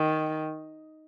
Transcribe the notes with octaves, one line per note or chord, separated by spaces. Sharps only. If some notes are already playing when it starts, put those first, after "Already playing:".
Already playing: D#3